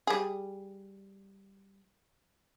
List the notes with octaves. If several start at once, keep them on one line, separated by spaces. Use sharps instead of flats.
G3 G#4